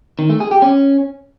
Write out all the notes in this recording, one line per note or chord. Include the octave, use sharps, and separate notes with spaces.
D#3
A3
G#4
G4
C#4